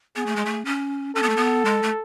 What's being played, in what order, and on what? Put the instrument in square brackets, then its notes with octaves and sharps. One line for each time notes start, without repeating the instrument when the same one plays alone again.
[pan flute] B3 [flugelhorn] G#4
[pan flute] A3
G#3
A3
C#4
[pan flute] C#4 [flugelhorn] A4
[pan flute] B3
A3
B3
G#3
A3